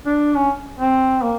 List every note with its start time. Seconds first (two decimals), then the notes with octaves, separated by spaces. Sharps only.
0.05 D4
0.35 C#4
0.79 C4
1.23 A#3